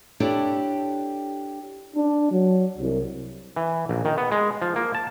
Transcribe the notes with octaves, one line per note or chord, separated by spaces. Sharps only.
D4 E4 G4 A4 C#5 D5
D4
F#3
C2
E3
A#1
D#3
B3
G#3
F3
A#3
A5